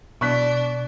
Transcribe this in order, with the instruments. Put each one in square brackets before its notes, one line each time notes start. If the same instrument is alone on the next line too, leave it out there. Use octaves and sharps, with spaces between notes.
[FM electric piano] B2 [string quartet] D4 [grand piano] C#6 F#6 B6